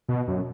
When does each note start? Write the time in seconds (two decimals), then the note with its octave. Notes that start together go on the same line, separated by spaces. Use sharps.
0.08 B2
0.28 F#2